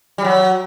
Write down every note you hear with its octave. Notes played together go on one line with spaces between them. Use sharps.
G3
F#3